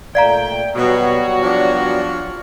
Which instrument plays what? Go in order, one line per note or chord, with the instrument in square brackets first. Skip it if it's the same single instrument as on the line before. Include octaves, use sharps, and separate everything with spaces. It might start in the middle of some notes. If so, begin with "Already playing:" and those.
[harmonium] A#2 A3 [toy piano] D5 F5 A#5 [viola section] G5
[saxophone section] B2 [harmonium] F#3 G3 B3 [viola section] F#4 C#5
[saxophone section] F3 D4